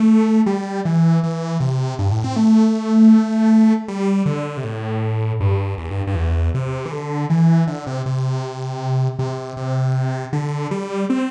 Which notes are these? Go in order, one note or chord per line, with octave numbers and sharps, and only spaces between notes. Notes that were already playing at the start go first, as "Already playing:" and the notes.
Already playing: A3
G3
E3
E3
C3
G2
A2
C4
A3
G3
D3
C3
A2
G2
E2
G2
G2
E2
C3
E3
D3
E3
D3
C3
C3
C3
C3
D3
G3
C4